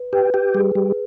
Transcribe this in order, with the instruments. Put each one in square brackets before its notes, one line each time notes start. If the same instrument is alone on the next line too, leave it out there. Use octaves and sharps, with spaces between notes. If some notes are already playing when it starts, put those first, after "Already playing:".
Already playing: [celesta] B4
[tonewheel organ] G4 [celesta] B4
[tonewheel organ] G4
[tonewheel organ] G3 [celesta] G#4
[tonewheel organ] G3